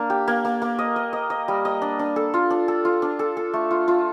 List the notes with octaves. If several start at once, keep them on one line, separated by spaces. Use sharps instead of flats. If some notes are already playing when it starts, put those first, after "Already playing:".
Already playing: A#3 D4
G4
A#3
A#3
A#3
D#5
D#5
D#5
D#5
G3
D#5
D4
D4
A4
F4
D4
A4
F4
D4
A4
A4
A3
F4
F4